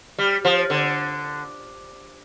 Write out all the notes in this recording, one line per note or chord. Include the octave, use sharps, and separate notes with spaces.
G3
F3
D3